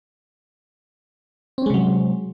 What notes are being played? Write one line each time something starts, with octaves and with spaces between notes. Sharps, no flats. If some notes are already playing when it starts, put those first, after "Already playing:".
C3 F#3 G#3 C4 C#4